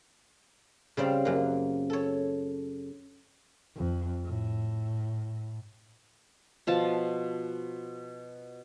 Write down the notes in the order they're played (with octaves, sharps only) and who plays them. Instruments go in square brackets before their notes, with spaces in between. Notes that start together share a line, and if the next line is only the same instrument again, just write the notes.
[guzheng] C#3 G3 C4 F5
F#2 A#3
A4 C#5
[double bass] F2
A2
[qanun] B2 F3 A5